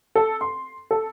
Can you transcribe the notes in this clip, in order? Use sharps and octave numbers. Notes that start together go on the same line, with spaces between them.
A4
C6
A4